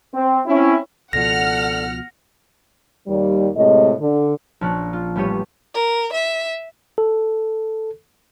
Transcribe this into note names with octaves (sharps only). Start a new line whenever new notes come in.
C4
C4 C#4 E4
C#2 B2 F3 A4 D5 F#5 F6 A#6
D#2 G3
A2 C3 G#3 D#5
D3
A#1 F3 C#4 F#6
F4
A1 G3 B3 G4 C#5 D#7
A#4
E5
A4